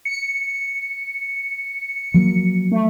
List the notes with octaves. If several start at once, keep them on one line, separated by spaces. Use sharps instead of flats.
C#7
F3 F#3 A#3
A3